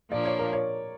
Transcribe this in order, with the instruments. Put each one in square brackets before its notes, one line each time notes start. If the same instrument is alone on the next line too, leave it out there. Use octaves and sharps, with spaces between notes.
[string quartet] A#2 F3 A#3 D4 [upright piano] D5
[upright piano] C#5
A#4
C#5